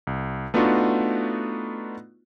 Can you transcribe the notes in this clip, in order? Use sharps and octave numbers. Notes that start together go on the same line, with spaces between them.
C2
A3 B3 D4 D#4 F4 F#4